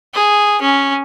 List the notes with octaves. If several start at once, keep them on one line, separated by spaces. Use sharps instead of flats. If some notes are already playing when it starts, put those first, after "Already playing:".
G#4
C#4